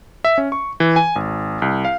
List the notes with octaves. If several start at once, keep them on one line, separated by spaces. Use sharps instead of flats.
E5
C#4
C#6
E3
G#5
G#1
C2
F5